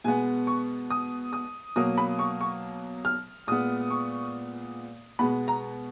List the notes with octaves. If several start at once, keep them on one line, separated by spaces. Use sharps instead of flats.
B2 G#3 B3 G#5
C#6
D#6
D#6
B2 F#3 A#3 D#6
B5
C#6
C#6
F6
A#2 G#3 B3 D#6
C#6
B2 G#3 B3 B5
A#5